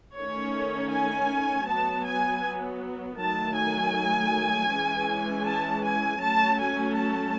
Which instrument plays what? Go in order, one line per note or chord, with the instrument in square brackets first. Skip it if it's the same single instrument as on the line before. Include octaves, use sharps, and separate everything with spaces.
[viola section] D#3 A3 C#4 C#5
G#5
F#3 B3 A5
G#5
D#3 F#3 A3 A5
G#5
E3 G#3 C#4
A5
G#5
F#3 A3 C#4 A5
G#5
A5